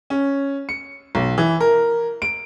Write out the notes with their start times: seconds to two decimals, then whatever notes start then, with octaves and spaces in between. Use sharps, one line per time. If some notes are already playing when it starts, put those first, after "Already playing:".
0.10 C#4
0.69 C#7
1.15 B1
1.38 E3
1.61 A#4
2.22 D7